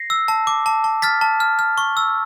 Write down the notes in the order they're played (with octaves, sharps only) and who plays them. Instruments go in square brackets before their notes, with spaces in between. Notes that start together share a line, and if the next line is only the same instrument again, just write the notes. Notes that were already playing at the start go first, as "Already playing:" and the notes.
Already playing: [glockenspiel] A#6 C7
E6
A5
D6
A5
A5
F6 A6 B6
A5
F6
F6
C#6
E6